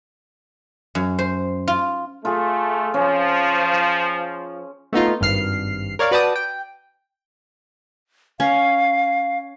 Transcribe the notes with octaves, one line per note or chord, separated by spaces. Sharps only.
F#2
C5
F4
A3 F4 G#4
F3 C#4
A3 B3 D#4 F4
G#1 G2 F6 C7
A#4 C#5 D5 F5
F#4 B4 D5 G5 A5 D#6
G5
C#4 F5